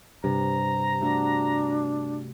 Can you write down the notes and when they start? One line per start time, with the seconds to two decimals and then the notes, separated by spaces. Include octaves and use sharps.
0.24 G2 C3 A#5
1.01 A3 D4 F#4